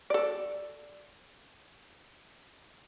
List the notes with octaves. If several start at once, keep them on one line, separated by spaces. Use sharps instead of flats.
A4 D5